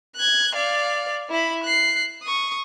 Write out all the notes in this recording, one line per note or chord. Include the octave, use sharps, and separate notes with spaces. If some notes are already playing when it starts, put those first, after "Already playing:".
F#6 G#6
D5 F5
E4 B5
F#6 C7
C#6 D#6